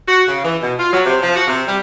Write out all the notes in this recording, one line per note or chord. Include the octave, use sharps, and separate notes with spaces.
F#4
C#3
E3
B2
F4
F#3
C3
F3
F#4
C3
G3